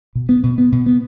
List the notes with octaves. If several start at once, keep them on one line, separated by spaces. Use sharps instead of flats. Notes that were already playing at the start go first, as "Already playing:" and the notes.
B2
B3
B2
B3
B2
B3